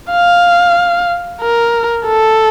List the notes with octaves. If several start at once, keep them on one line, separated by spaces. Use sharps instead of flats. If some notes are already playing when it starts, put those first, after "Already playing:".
F5
A#4
A4